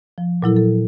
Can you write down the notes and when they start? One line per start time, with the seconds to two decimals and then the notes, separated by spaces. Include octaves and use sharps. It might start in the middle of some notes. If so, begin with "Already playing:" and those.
0.18 F3
0.42 A#2 F#3 E4 A4
0.57 A4